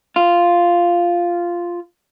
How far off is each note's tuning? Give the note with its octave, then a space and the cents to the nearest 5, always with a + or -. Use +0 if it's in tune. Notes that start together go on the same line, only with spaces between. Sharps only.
F4 -5